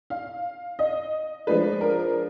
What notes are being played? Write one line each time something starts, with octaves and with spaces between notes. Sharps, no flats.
F5
D#5
F3 G#3 D4 B4
A#4